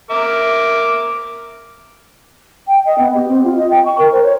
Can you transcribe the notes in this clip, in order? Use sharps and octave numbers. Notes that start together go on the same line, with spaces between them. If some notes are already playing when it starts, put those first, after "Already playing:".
A#4 E5 D6
G5
D#5
B3
G4
C4
F4
D#5
G5
C#6
A#4
C5
C#5